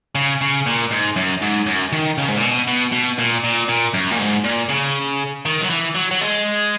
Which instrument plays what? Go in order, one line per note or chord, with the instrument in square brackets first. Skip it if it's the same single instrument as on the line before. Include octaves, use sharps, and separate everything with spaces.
[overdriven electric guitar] C#3
C#3
A#2
G#2
F#2
G#2
F#2
D#3
C#3
G#2
A#2
B2
B2
B2
A#2
A#2
A#2
F#2
A#2
G#2
A#2
C#3
D#3
F#3
E3
F#3
F#3
G#3